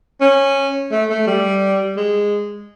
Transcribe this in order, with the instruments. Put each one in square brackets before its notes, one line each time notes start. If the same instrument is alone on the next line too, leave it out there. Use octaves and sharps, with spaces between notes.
[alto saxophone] C#4
A3
A3
G3
G#3